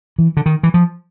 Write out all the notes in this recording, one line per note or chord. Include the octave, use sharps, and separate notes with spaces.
E3
D3
D#3
E3
F3